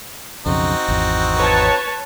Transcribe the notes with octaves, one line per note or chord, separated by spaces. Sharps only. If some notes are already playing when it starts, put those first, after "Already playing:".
B1 F2 C#3 C4 D#4 F#4
G#1 E2
B4 C#5 A5